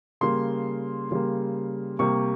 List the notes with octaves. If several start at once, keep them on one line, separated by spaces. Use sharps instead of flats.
C#3 G3 A#3 C6
C#3 G3 A#3
C3 G3 A#3 C#6